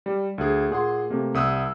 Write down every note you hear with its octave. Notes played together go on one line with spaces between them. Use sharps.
G3
D2 G#4
A#2 G#4 F#5 C6
C3 A3 A#3
C2 D#6 E6 F#6